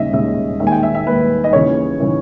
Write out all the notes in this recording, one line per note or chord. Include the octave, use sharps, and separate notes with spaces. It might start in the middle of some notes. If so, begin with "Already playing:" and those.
Already playing: D#2 C#3 G#3 D#5 E5
D#2 C#3 G#3 E5
D#2 D#3 G#3 E5
G#5
G5
E5
E5
D#2 D#3 G#3 B4
D#5
D#2 C#3 E3 C#5
C#3 E3